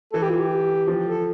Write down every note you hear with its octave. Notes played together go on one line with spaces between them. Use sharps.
E3 A4
G4
F4
G4
F3
A4